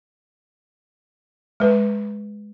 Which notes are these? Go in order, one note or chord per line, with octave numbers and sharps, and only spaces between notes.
G#3 B4